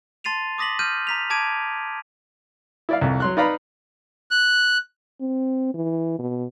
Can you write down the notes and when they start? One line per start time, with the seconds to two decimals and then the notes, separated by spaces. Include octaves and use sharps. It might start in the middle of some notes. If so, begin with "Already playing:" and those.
0.24 A5 C6 A6 C7 D#7 F7
0.58 D6 D#6 A#6 B6 F#7
0.79 F6 G6 D#7
1.07 A#5 B6 F7
1.30 A5 D6 G#6 D7 D#7
2.89 E4 D5 F5
3.01 C2 F2
3.20 F#3 C6 F#6
3.37 D#4 B4 D5 F5 A#5 B5
4.31 F#6
5.21 C4
5.74 E3
6.19 B2